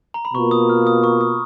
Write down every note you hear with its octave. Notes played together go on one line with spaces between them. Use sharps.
A#5
B5
B2 A#3 F4 C#6
D#6
F6
D#6
C#6
D#6